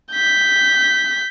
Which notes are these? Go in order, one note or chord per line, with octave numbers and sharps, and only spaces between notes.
G6 B6